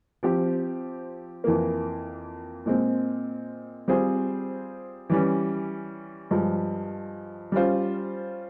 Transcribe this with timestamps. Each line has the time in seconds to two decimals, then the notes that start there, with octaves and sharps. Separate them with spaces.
0.23 F3 C4 G4 C5
1.44 F2 E3 A#3
2.66 A#2 G#3 C4
3.88 G3 C4 F4 G#4 C5
5.10 E3 G3 C#4
6.31 G2 F3 G#3
7.52 G3 C#4 F4 C5